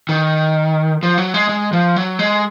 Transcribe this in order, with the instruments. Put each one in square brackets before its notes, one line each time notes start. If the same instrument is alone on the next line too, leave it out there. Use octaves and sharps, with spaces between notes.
[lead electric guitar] D#3
F3
F#3
G#3
G#3
F3
F#3
G#3